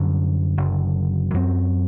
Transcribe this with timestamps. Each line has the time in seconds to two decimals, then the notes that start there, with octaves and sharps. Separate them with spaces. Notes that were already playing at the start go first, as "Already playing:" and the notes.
Already playing: F#2 D3 G3
0.57 F#1 F#2 D3
1.34 F#2 F#3 C4